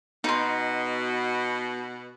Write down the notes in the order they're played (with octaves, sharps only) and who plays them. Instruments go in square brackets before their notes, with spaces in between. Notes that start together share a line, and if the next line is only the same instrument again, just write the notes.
[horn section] B2 [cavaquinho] D#4 C6